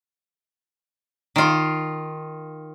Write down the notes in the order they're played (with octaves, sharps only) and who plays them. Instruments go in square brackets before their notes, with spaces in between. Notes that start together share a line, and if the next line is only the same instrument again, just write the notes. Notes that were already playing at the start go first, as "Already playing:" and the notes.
[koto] D#3 F4